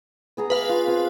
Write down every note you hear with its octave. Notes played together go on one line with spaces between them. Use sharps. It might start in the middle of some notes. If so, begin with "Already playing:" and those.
B3 G#4 A#5
B4 F5 D6
F4
C4 F4 G#4